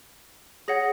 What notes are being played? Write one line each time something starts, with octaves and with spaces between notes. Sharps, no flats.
G#4 C#5 F#5 A#6